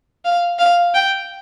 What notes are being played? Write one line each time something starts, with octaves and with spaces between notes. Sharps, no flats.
F5
F5
G5